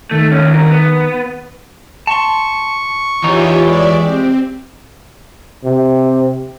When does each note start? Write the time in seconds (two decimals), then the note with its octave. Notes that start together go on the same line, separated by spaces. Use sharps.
0.11 D#3 A3
0.32 C#4 D#4
0.50 C2 A#4
0.71 B3
2.07 A5 C6 C#6
3.24 E2 E3 D#4 F4 G4 C#5 E5
3.65 G#3 D5 E5
4.04 C4 G4
5.64 C3